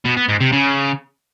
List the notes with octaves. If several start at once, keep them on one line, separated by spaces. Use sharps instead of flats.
B2
B3
G#2
C3
C#3